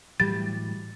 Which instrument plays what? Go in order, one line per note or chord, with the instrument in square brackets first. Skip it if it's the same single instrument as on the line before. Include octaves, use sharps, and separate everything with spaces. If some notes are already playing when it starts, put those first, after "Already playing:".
[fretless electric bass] A2 E3 F#3 [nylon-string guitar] G3 [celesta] A6